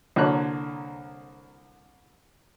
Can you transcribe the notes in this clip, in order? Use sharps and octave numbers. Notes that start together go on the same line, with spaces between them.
C2 D3 A#3 C#5 F#6